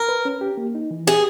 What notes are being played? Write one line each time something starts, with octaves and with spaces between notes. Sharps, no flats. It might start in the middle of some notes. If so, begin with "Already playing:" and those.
Already playing: A#4
B4
C#4
G4
A#3
D#4
E3
G4 G#4